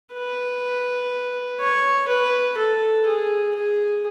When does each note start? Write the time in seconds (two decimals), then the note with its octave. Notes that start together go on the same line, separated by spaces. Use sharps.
0.13 B4
1.61 C#5
2.08 B4
2.57 A4
3.06 G#4
3.55 G#4